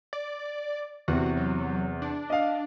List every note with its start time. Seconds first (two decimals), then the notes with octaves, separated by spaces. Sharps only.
0.13 D5
1.08 E2 C3 F#4
1.37 F#3
2.02 D4
2.30 D#5 F5